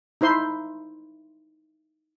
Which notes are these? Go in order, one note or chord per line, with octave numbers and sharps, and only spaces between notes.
D#4 E4 C5 C6